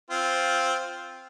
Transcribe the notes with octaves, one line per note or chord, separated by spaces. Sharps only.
C4 F4